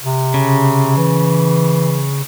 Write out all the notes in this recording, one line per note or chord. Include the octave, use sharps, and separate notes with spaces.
C3
C#3
E3